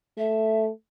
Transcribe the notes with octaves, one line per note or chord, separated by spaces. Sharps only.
A3 E5